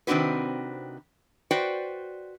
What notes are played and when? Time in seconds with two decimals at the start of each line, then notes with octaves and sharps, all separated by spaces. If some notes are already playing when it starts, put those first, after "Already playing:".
0.07 C3 D#3 C4 D4 F#4 B4
1.51 F#4 B4 C5 D5 G5